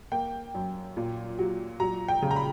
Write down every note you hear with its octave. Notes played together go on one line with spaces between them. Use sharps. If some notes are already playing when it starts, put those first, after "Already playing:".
A#3 G5
F#2
A#2
F#3
F#3 A#5
G5
C#3
A#5
B5